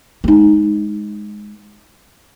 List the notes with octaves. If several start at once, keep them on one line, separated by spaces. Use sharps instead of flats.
G#3 D#4